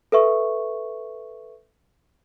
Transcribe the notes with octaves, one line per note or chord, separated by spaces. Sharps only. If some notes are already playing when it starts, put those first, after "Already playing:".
A4 B4 E5 C#6